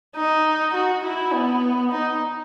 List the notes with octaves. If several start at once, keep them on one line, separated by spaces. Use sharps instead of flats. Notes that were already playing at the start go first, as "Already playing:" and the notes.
D#4
F#4
E4
B3
D#4